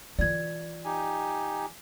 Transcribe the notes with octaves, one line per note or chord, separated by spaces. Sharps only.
E3 F4 D5 G#6
D#4 G4 G#5